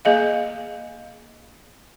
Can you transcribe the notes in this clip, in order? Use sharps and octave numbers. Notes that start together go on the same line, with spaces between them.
A#3 G#4 D#5 F5